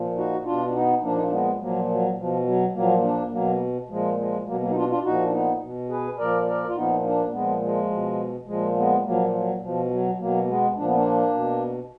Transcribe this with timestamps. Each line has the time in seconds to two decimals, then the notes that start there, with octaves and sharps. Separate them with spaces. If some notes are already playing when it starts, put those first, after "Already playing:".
Already playing: A#2 F3
0.16 D#4 F#4
0.45 B2 D4 F4
0.67 D4
0.74 B3 D#4
1.02 A#2 F3 A#3 D4
1.15 D#4
1.23 D4
1.31 G#3 B3
1.60 A#2 F3 F#3 A#3
1.89 F#3
2.17 B2 F3
2.46 F#3
2.74 A#2 F3 F#3 A#3
3.03 A#3 D4
3.32 B2 F#3 A#3
3.89 A#2 F3 G#3
4.17 F3 G#3
4.46 B2 F#3 A#3
4.61 F#3 A#3
4.70 D#4
4.75 D4 F4
4.89 D4 F4
5.03 A#2 F3 D#4 F#4
5.25 D4
5.32 B3 D#4
5.62 B2
5.89 G#4 B4
6.18 A#2 F3 A#4 D5
6.47 A#4 D5
6.68 F4
6.76 A#2 F3 B3 D#4
7.04 A#3 D4
7.32 A#2 F3 G#3 B3
7.62 F3 G#3
7.90 B2
8.47 A#2 F3 G#3
8.77 G#3 B3
9.05 A#2 F3 F#3 A#3
9.34 F#3
9.62 B2 F3
9.91 F#3
10.19 B2 F#3 A#3
10.47 G#3 B3
10.76 A#2 F3 D4
10.86 B3
10.95 A#3 D4
11.34 B2